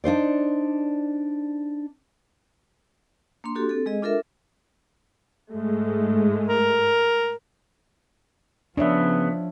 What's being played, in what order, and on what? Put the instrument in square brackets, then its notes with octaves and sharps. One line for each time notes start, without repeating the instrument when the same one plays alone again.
[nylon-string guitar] D4 D#4 C5 D5
[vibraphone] A#3 D4 C6
D4 F#4 G4 A4
C4 A4
G#3 G#4 D#5
D4 F4 A4 A#4 E5
[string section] G#2 G#3 A3
[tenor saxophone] A#4
[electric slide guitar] C#3 B3 [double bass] F3 [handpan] D4 C#5 E5